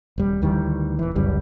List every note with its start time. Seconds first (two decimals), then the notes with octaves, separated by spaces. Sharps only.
0.18 D#1 G3
0.42 D2 D#3 E3 G3
0.99 D#1 E3
1.15 G1 C#2 F#2 G3